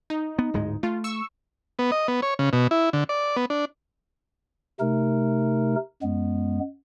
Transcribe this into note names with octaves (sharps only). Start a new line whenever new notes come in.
D#4
B3
D1 G#2 G#3
A3 F4
C#6 E6
B3
D#5
B3
C#5
C#3
B2
E4
D3
D5
B3
D4
C3 A3 D#4 A#4
F#2 G#3 B3